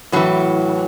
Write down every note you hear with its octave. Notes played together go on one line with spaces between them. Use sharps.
A2 E3 F#3